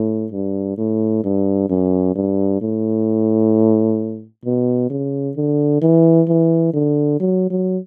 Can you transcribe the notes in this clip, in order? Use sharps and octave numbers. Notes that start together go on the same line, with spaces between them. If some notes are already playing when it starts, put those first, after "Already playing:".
Already playing: A2
G2
A2
G2
F#2
G2
A2
B2
C#3
D3
E3
E3
D3
F#3
F#3